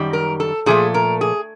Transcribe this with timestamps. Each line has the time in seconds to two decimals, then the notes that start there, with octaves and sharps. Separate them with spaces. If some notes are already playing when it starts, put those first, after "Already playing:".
Already playing: F#2 D#3 G3
0.13 A#4
0.40 A4
0.66 A#2 F3 A3 G#4
0.94 A#4
1.21 G#4